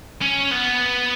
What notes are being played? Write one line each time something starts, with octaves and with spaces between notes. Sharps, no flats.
C#4
B3